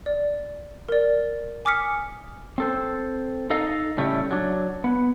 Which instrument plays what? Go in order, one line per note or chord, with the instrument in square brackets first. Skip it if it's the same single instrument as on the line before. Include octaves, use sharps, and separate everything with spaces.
[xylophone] D5
A#4 D5
G#5 D6 D#6 F6 B6 C#7
[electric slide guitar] C4 A4 C5
D#4 A4 D#5 F5
A2 C#3 G3 A3 C#4 E4
F#3 D4
B3